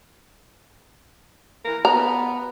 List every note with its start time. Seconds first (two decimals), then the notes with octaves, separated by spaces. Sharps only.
1.65 E3 A#4
1.85 B3 A#5